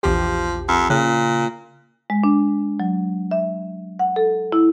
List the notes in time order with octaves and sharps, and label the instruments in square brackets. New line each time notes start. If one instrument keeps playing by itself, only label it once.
[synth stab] A#1 E2 G4 [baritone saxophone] F3
[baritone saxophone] F2
[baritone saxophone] A#2 [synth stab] C#3
[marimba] G#3
D4
F#3
E5
F#5
A4
E4